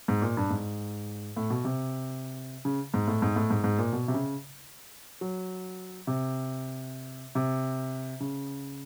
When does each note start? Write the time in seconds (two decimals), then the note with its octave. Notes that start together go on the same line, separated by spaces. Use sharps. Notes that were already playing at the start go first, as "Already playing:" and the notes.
0.08 G#2
0.22 A#2
0.37 G2
0.50 G#2
1.37 A2
1.50 B2
1.65 C3
2.65 C#3
2.94 G#2
3.08 A2
3.22 G#2
3.36 A2
3.50 G#2
3.64 G#2
3.78 A#2
3.93 B2
4.08 C3
4.14 C#3
5.21 F#3
6.07 C3
7.35 C3
8.20 C#3